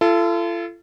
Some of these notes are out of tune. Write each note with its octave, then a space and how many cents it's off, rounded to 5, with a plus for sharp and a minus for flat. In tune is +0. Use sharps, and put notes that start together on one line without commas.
F4 -40 A4 +0